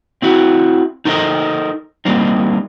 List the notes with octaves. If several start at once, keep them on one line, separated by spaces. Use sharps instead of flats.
C4 E4 F#4
D#4 A4 A#4 C5 D#5
G3 A#3 C4 D#4